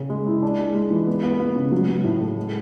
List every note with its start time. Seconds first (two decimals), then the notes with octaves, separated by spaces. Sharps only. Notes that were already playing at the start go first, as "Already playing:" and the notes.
Already playing: C#3 C#4
0.10 G#3
0.27 E4
0.42 D4
0.59 G#3
0.75 G#3
0.91 E3
1.07 B3
1.23 B3
1.39 B3
1.56 C#3
1.72 F#3
1.89 F#3
2.04 A2
2.20 A3
2.37 G#3